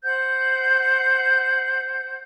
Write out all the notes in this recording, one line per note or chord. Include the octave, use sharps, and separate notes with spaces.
C5 F#5 G6